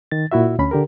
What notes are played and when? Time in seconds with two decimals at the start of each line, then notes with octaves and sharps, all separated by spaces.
0.12 D#3 A6
0.32 A#2 E4 F#4 E5
0.59 D2 C#4 B5
0.71 D3 G4 A#4